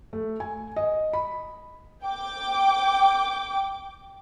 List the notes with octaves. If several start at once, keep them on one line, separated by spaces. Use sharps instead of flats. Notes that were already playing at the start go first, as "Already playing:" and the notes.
A3
G#5
D#5
B5
G5 D6